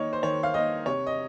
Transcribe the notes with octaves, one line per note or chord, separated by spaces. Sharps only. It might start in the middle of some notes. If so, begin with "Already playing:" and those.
Already playing: D#3 A#3 D#4 C#5
C5
D#3 C#5
F5
A#3 D#4 D#5
C3 C#5
D#5